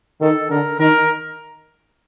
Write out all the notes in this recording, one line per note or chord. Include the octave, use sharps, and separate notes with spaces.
D#3 A4
D3 A#4
D#3 A#4